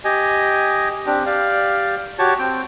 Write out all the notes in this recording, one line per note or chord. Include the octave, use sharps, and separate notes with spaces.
G4 D#5 G#5
C4 D4 G4
G4 D5 F5
F#4 G4 C#5 A5
C4 G5